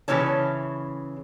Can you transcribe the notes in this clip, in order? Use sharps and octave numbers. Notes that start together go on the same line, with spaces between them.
C#3 E3 C#4 E4 C#5 A5